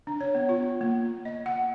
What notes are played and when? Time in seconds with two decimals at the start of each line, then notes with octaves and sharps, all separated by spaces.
0.07 D4
0.21 C#5
0.35 B3
0.49 F4
0.81 A#3
1.25 D#5
1.46 F#5